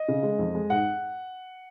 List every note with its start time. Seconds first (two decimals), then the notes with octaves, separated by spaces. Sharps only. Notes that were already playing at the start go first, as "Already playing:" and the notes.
Already playing: D#5
0.08 C#3
0.23 G#3
0.39 F2
0.55 G#3
0.70 G#2 F#5